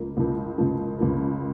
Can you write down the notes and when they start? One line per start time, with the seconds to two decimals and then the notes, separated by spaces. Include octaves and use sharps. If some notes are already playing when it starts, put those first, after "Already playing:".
Already playing: C#2 C#3 F3 A#3
0.17 C#2 C#3 F3 A#3
0.57 C#2 C#3 F3 A#3
0.99 C#2 C#3 F3 A#3